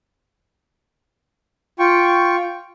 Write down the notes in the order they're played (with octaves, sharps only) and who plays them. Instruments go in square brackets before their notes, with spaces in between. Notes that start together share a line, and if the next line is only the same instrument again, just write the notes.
[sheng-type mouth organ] F4 G5 C#6